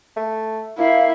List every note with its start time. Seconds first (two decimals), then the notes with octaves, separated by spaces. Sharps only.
0.17 A3
0.78 A#3 E4 F5